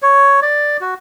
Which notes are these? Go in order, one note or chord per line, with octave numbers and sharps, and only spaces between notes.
C#5
D5
F#4